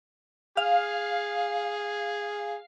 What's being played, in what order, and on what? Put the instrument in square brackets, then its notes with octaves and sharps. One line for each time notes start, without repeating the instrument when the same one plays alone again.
[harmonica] G#4 [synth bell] F5